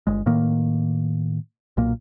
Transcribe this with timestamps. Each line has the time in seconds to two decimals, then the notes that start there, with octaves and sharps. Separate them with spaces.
0.07 G1 G#3
0.26 A2 D#3 A#3
1.77 B1 A#2 A#3